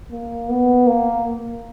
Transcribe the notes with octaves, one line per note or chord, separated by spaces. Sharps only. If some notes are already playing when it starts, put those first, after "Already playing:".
A#3
B3
A#3